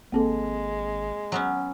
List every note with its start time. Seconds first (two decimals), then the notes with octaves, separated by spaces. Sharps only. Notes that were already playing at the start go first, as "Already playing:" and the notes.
0.12 G#1 G#3 A#3 C4 A4
1.32 F#3 B3 C#4